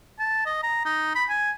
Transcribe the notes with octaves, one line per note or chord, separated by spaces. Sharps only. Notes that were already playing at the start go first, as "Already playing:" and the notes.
A5
D#5
A#5
D#4
B5
G#5